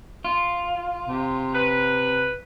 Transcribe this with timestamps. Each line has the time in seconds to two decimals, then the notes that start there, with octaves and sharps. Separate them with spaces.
0.25 F4
1.08 C3
1.55 B4